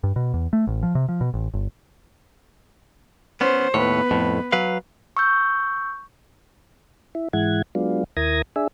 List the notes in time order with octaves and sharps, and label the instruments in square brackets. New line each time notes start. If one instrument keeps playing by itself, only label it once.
[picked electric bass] G2
B2
E2
A3
A1
F3
C3
F3
B2
A1
G1
[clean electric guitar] B3 C#4 [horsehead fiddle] C5
[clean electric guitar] D#2 A2 C#5 [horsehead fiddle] B3 B4
[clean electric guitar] F2 A2
F#3 B4 F5
[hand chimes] C#6 E6 G6
[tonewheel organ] E4
G#2 E3 G#3 E4 F#5 G#6
F#3 G#3 B3 D4 F4
D#2 E4 A#4 D#6 G#6 A#6
D4 G#4 E5